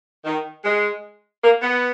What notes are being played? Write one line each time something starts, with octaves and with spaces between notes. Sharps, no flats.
D#3
G#3
A#3
B3